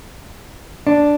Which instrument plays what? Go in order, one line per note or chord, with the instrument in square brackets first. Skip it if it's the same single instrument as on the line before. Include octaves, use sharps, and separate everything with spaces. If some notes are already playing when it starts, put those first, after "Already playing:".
[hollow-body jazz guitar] D4